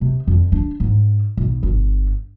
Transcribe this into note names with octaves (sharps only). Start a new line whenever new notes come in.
C3
F2
D4
G#2
B1
G1